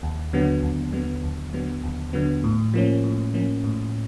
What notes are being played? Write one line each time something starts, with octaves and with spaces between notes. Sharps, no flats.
D#2
D3 F#3 B3
D#2
D3 F#3 B3
D#2
D3 F#3 B3
D#2
D3 F#3 B3
A2
F3 A#3 C#4
A2
F3 A#3 C#4
A2